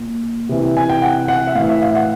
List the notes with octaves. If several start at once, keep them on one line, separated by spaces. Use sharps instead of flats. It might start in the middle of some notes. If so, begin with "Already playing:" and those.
Already playing: A#2
C3 E3
G#5
G5
F#5
F#5
E5
A2 E3 F5
E5
F5
F#5